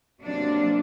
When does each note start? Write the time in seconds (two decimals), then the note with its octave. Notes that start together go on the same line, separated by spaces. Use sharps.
0.22 C3 F#3 A#3 D4